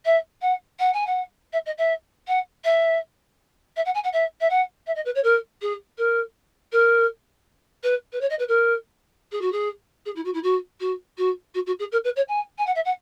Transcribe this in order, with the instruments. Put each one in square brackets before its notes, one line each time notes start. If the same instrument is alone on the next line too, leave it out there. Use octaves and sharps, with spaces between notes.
[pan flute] E5
F#5
F#5
G#5
F#5
E5
D#5
E5
F#5
E5
E5
F#5
G#5
F#5
E5
E5
F#5
E5
D#5
B4
C#5
A#4
G#4
A#4
A#4
B4
B4
C#5
D#5
B4
A#4
G#4
F#4
G#4
G#4
E4
F#4
E4
F#4
F#4
F#4
F#4
F#4
G#4
A#4
B4
C#5
G#5
G#5
F#5
E5
F#5